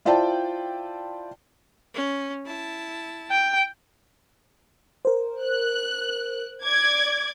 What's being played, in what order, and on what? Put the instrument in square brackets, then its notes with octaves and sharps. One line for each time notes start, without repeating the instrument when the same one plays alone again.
[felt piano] E4 F4 C5 D5 G5 A5
[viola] C#4
E4 A5
[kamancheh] G5
[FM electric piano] A#4 C5
[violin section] F#6
D5 D6 G#6